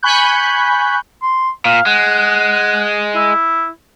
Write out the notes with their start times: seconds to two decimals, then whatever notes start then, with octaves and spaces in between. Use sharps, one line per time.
0.03 G#5 B5 C#6 F#6 G6
1.22 C6
1.65 A#2 F5
1.86 G#3 F#5
3.15 E4